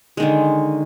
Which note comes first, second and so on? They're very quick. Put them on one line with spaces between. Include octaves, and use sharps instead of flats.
G#3 D#3 D3